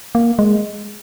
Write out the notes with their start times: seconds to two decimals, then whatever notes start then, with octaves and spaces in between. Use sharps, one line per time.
0.15 A#3
0.39 G#3